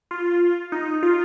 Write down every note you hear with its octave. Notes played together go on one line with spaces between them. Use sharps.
F4
D#4
F4